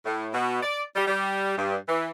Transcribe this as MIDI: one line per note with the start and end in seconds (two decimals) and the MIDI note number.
0.06 0.28 45
0.33 0.61 47
0.63 0.83 74
0.96 1.05 55
1.07 1.56 55
1.58 1.78 43
1.89 2.10 52